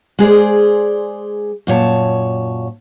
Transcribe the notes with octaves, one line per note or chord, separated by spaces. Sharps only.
G#3 G#4 C5 D5
F#2 A#2 C#5 A5